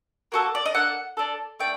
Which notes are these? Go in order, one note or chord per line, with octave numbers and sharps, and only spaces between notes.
A#3 F#4 A4
D5
D#5
A#3 D4 A4 F#5
D4 A4
A3 D4 G5